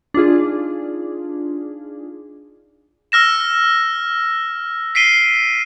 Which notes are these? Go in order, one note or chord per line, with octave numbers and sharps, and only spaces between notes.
D4 D#4 F4 G#4
E6 F6 A#6 E7
B6 C7 D7 D#7 G7